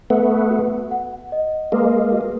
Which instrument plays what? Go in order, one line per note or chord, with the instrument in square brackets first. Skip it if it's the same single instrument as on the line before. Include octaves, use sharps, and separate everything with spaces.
[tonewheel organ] A3 B3 [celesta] B4
[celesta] F#4
F#5
D#5
[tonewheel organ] G#3 A#3 [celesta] B4
[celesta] F#4